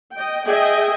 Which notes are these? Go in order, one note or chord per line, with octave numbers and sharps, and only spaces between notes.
D#5 G5
G#4 D#5 E5 G5 G#5